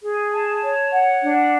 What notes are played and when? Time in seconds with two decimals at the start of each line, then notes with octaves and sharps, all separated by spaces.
0.03 G#4
0.33 A5
0.62 C#5
0.92 F#5
1.22 D4